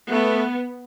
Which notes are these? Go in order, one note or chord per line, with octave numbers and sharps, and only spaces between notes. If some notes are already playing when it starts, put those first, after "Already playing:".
A3 B3